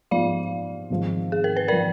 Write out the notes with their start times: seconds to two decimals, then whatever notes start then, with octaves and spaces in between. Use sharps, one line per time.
0.11 G#2 F3 B3 F4 D5 F5
0.90 G#1 G#2 F3
1.32 G#4
1.44 A#4
1.57 B4
1.68 F3 A#4 D5